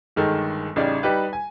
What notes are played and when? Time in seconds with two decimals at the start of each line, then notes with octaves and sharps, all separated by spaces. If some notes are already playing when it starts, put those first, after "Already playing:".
0.16 G1 D#3 G#3 A4
0.76 A1 C#3 G3 D#4 D5
1.03 G3 D#4 G4 B4
1.33 G#5